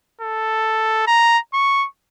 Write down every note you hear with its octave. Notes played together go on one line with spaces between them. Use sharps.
A4
A#5
C#6